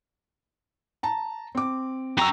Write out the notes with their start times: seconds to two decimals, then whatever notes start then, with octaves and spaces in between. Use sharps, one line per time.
1.03 A5 A#5
1.55 C4 D6
2.17 F#2 G5 A#5 C#6 E6